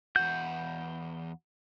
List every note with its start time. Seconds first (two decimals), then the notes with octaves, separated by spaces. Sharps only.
0.16 E2 F#4 G6